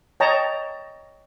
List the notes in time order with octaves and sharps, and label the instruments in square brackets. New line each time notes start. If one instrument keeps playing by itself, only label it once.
[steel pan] C#5 D#5 G5 A5 A#5